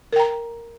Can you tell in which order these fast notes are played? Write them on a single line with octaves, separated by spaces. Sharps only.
A#4 G5 A#5